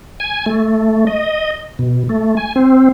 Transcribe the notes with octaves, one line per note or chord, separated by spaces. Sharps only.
G#5
A3
D#5
B2
A3
G#5
C4